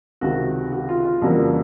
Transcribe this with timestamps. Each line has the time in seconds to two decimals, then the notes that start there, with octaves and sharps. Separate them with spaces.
0.21 C#2 C3 D#3 F#4
0.72 F#4
0.89 F4
1.05 F4
1.22 F2 C#3 E3 G3 A#3 F#4